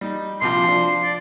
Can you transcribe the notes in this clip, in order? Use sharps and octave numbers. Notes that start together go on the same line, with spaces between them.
G3 D#4
A#1 C3 F3 C6
F3 D4
D5